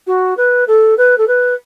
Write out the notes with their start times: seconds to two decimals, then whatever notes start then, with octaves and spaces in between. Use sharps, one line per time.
0.07 F#4
0.37 B4
0.68 A4
0.98 B4
1.18 A4
1.28 B4